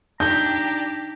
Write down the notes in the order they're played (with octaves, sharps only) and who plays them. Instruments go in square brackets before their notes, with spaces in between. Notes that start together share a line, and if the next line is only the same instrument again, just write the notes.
[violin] D4 G4 [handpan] D#4 [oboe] A#5 [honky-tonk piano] G6